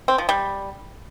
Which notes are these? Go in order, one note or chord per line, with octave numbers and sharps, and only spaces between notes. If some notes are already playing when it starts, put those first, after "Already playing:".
C4
F3
G3